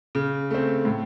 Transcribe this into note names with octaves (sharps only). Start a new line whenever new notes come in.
C#3
A3 C4
A2